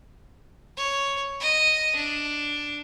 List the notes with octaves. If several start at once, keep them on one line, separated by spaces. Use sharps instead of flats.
C#5
D#5
D4